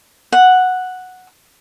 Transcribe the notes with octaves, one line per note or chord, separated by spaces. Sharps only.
F#5